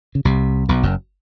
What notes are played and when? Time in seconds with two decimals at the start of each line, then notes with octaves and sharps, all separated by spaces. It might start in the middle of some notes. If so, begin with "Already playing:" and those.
0.15 C#3
0.25 C2 C3
0.69 B1 B2
0.83 F#1 F#2